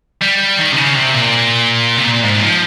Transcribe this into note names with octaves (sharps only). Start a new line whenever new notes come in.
G3
D#3
C3
C#3
C3
A#2
C3
A#2
G#2
D#3
F3